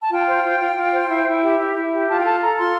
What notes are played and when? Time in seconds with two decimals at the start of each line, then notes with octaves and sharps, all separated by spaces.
0.01 A5
0.10 F4 G5
0.26 C5
0.43 F4
0.59 F4
0.76 F4
0.92 C5
1.08 E4
1.26 E4
1.41 G4
1.58 E4
1.75 E4
1.91 G4
2.07 F4 A5
2.19 G5
2.24 A4 A5
2.40 A4 A#5
2.57 F4 C6